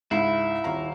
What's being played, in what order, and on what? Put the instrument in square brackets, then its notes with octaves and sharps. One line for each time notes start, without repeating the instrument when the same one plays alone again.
[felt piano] C#2 G#2 C7 [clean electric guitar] E4
[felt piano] D#1 F5 A#5